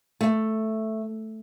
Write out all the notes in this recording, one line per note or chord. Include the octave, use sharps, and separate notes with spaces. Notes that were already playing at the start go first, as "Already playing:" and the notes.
A3